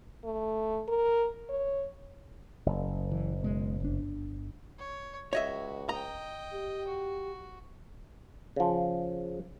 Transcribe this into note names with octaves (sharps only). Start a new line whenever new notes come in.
A3
A#4
C#5
F#1
E3
B2 G#3
G1 D4
C#5
C#2 F#4 C#5 D#5 E5
D#5 G5 A#5
G4
F#4
C#3 F3